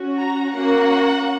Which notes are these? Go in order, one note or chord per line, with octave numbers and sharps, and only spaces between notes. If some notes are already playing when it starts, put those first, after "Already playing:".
Already playing: C#4 F#4
A#5
A#3 C#4 F#4 F#5